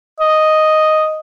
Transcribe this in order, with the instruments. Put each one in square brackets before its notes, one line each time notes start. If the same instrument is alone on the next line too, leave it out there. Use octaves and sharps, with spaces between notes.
[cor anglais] D#5